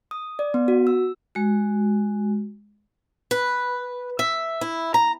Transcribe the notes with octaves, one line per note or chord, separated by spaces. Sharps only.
D#6
D5
B3
F#4
E6
G#3 F#4
B4
E5
E4
A#5